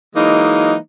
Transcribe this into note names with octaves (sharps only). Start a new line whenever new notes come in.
E3 F#3 G#3 A#3 D#4